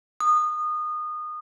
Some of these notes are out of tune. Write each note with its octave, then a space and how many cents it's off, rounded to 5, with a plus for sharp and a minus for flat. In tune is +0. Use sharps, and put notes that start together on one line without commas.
D#6 -25